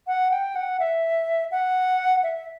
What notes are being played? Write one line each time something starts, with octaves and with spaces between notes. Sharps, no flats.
F#5
G5
F#5
E5
F#5
E5